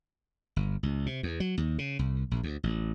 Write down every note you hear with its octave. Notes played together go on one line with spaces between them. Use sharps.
G1
C#2
C3
E2
F#3
D#2
C#3
C2
A#1
D2
A1